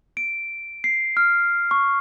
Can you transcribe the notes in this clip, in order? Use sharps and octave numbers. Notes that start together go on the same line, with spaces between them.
D7
C7
F6
C#6